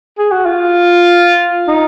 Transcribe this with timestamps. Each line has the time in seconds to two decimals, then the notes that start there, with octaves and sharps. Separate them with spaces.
0.19 G#4
0.32 F#4
0.46 F4
1.68 D#4